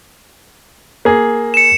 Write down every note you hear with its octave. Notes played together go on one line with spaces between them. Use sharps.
A#3 G#4
C#7 E7